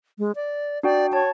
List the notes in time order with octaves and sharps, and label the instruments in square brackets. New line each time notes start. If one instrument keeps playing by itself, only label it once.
[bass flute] G#3
D5
[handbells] D4 F#4 G5 [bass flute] D5
[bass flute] C#5 [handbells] A5